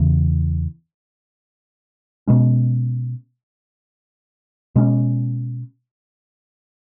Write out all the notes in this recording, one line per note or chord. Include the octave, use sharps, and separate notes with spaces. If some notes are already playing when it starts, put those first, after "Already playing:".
Already playing: E2 C#3 E3
B2 G#3 C#4
B2 G#3 C#4